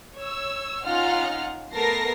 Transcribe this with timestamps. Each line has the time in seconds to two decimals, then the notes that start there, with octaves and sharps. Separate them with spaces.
0.15 C#5 E6
0.84 C#4 D#4 F4 F#5 F6
1.73 A3 B3 A#4 A5 A#6 C7